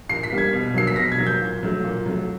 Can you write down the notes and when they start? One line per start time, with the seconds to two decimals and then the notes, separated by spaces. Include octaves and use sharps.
0.09 A#2 C7
0.23 B6
0.32 G3 A#3
0.38 G#6
0.53 B2
0.74 F#3 A#3 C7
0.87 B6
0.96 B2 A#6
1.12 G#6
1.18 F#3 A#3
1.26 G6
1.41 A#2
1.63 F#3 A3
1.84 A#2
2.06 F#3 A3